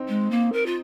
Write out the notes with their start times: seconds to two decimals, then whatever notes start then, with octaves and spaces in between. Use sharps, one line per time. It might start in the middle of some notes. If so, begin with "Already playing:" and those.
Already playing: C4 D#4
0.08 G#3
0.31 A#3
0.52 A#4
0.66 F4